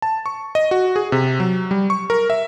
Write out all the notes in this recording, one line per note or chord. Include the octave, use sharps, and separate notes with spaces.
A5
C#6
D#5
F#4
G#4
C3
F#3
G3
C#6
A#4
E5